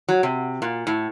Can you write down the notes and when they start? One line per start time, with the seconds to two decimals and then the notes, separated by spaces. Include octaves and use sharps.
0.09 F#3
0.23 C3
0.62 A#2
0.87 A2